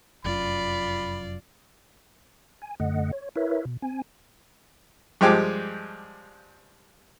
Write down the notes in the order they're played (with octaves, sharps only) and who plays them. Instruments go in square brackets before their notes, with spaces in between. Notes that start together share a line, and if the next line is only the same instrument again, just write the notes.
[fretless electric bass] F1 F#2 [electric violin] F4 D5 [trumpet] B5
[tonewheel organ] G#5
F#2 D3 A3 D#5 F#5
C#5
E4 A#4 B4 C#5 E5
B2
C4 G#5
[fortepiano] G2 F3 G#3 G4 G#5 D6